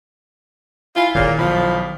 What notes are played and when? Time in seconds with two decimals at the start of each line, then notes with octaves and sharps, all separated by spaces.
0.96 E4 F4 G#5 B5
1.15 A#2 D#3 E4 G#4 A#4 C#5
1.38 B1 F3 B5